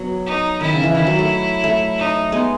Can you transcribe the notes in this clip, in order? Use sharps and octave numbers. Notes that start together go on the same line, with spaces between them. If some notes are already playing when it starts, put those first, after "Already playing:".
Already playing: F#3 B3
D#4
D#3 E4
C#3
E3
D#3 E4
F#3
A3
A3
D#4
G#3 B3